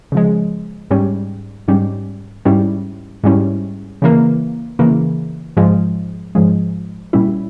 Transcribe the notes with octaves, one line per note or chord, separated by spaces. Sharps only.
C#3 F3 G#3
G#2 G3 C#4
G#2 G3 C#4
G#2 G3 C#4 E4
G#2 G3 C#4 E4
C#3 E3 A#3
C#3 E3 A#3
G#2 F3 G#3
G#2 F3 G#3
A#2 G3 C#4 E4